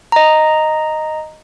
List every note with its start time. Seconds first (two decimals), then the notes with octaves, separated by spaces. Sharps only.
0.12 D#5 A#5